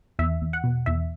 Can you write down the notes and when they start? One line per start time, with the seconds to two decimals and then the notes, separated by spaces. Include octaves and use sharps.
0.19 E2 E5
0.41 E2
0.53 F#5
0.64 B2
0.86 E2 E5